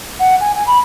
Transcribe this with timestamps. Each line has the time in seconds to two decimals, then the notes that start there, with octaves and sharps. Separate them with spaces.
0.20 F#5
0.41 G#5
0.55 G#5
0.67 B5